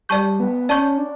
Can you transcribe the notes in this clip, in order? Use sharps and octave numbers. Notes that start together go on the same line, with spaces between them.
G3 D5 A5 C#6 G6
B3
C#4 D5 A5 C#6 G6
D4